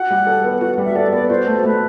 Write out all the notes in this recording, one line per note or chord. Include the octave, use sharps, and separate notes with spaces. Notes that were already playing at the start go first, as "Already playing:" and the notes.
Already playing: F#4 F#5
G3
A4
B3
F#4 F#5
G3
E5
A4 D5
B3 D5
F#4 C5
A3
A3 B4